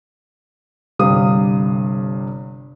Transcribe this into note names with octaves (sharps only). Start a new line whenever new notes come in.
G1 G2 C3 G4 F5 D#6